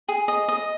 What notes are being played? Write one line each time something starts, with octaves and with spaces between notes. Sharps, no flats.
G#4
D#5
D#5